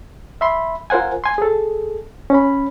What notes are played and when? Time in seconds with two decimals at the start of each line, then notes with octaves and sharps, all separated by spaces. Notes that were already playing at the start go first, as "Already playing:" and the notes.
0.41 E5 B5 C6
0.90 F4 A#4 C5 F#5 G#5
1.24 G#5 C6
1.38 G#4 A4
2.30 C#4 B5